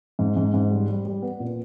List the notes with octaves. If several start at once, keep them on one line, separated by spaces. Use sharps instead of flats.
G#2
G#2
G#2
G3
G3
G3
B3
A#2